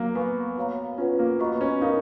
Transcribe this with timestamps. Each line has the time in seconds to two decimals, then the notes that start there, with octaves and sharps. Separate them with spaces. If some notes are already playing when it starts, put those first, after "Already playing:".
Already playing: F#3 A#3
0.14 B3 B4 F5 G#5 C#6
0.57 F#4 C#5 F5 A#5
0.98 C#4 F4 B4 F#5
1.19 A#3
1.40 B3 F#4 B4 D#5 A#5 C#6
1.61 C#4
1.81 D#4 A#4 F5 A#5